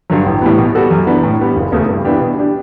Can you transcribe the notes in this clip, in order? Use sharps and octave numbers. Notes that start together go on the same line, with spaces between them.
G2 D3 F#3
A1
A2 E3 G3 B3
B2
G3 B3 F#4 A4
F#2
E3 B3 D4
A2
G3 B3
F#1
E2 C#3 E3 A3
G2
E3 B3 D4 G4
B2
G3 D4 G4